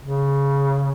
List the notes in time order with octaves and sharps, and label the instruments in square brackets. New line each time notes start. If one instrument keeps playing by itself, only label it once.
[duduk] C#3